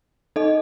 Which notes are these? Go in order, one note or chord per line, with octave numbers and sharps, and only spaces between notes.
D#4 A4 D#5